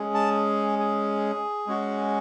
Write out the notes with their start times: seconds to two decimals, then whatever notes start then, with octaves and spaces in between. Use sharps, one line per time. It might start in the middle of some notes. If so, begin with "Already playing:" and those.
Already playing: G#3 C#4 G#4
0.14 A5
0.79 G#4
1.67 G#3 C#4 F#4